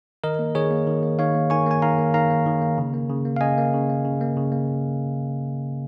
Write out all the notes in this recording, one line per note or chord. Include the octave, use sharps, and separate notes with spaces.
D#3 A#4 D#5
A#3
D#3 G#4 C#5
A#3
D#3
A#3
D#3 C#5 F5
A#3
D#3 G#5 C#6
A#3 G#5
D#3 F5 A#5
A#3
D#3 F5 A#5
A#3
D#3
A#3
C#3
A#3
C#3
A#3
F5
C#3 D#5 G#5
A#3
C#3
A#3
C#3
A#3
C#3
A#3